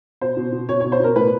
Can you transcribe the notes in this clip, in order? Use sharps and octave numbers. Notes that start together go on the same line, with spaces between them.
B2 C5
B2
B2
B2 C#5
B2 C#5
C5
B2 A#4
A2 B4